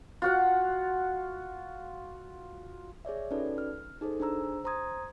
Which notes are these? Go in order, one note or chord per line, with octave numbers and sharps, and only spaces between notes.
F4 F#4 F#5
G#4 C#5 D5 E5
C#4 D#4 F#4 A4 B4 D5
F6
D#4 G#4 A4 C5
D4 G#4 C5 A#5 E6
C5 A#5 C6 D#6 G#6